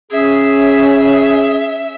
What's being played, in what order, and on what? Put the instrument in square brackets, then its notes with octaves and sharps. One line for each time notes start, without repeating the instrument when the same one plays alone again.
[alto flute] C#4 [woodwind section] G#4 [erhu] E5